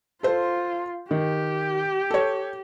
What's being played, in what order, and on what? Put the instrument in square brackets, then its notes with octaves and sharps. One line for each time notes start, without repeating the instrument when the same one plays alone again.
[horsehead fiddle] F4 [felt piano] A4 C5
[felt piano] D#3 [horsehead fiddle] G4
[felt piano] A4 C#5